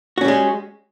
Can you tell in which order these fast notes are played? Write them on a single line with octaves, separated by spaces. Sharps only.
F#4 C#4 G3 G#3